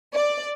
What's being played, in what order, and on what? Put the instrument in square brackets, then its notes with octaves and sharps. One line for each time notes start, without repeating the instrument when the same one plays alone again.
[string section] D5